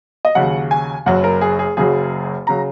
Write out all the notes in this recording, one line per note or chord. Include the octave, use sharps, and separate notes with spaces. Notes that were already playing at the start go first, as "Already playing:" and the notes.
D#5
D#2 C#3 F#3 F#5
G#5
F#1 F#2 F#3 F#5
A#4
G#4
G#4
F#1 F#2 C#3 F#3 G#4
C#3 F#3 A#5